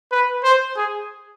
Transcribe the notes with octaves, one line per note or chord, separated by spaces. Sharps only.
B4
C5
G#4